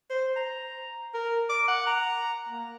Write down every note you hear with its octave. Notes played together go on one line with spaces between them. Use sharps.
C5
A#5
A#4
D6
F#5
A#5
A#3